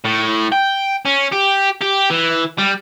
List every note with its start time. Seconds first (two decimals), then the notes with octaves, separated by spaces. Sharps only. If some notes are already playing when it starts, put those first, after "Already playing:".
0.05 A2
0.52 G5
1.05 C#4
1.32 G4
1.81 G4
2.10 E3
2.58 G3